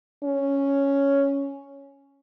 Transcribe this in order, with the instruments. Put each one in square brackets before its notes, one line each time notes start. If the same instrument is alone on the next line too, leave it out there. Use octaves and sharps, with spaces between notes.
[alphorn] C#4